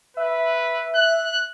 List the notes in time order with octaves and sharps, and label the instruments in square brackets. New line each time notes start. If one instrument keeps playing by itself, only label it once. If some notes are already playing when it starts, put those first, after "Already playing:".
[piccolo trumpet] B4 [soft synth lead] E5
[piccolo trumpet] F#6